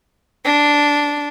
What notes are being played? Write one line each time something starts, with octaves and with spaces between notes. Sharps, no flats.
D4